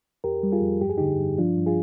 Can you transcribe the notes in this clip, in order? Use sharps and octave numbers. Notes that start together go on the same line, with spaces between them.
F2 G4 A#4
G3
F4 G#4
F2
G2 G4
G#4
D3 D#4 G4
G2
F3 D4 F4
G2
F4 G#4